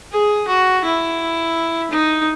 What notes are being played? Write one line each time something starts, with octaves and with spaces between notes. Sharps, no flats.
G#4
F#4
E4
D#4